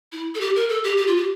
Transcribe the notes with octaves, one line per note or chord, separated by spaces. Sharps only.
E4
A4
G4
A#4
A4
G4
G4
F4
G4